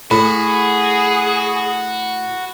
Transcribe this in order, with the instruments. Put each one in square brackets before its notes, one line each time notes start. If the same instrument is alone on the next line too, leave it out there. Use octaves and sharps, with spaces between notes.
[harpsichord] A2 [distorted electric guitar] F#4 [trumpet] G#4 [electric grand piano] B5